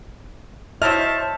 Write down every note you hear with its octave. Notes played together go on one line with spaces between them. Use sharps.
F#3 E4 C5 C#5 D#5 E5 A5 F6